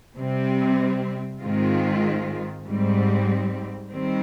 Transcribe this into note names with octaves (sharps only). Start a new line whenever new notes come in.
C3 G3 C4
G#2 D#3 G#3 C4 F4
G#2 G3 C4
D#3 G3 C4